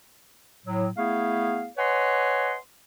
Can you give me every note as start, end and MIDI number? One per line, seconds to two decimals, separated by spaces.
0.66 0.87 45
0.66 0.87 54
0.96 1.68 57
0.96 1.68 59
0.96 1.68 64
0.96 1.68 68
0.96 1.68 77
1.78 2.56 71
1.78 2.56 73
1.78 2.56 75
1.78 2.56 78
1.78 2.56 80
1.78 2.56 84